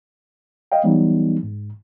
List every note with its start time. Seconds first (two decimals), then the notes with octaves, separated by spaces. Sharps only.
0.72 D#5 F5 G5
0.84 E3 F#3 G3 B3 D#4
1.43 G#2